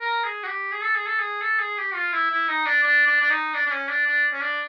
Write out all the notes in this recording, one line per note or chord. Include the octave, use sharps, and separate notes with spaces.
A#4
G#4
F#4
G4
G#4
A4
G#4
A4
G#4
A4
G#4
G4
F4
E4
E4
D#4
D4
D4
D4
D4
D#4
D4
D4
C#4
D4
D4
C#4
D4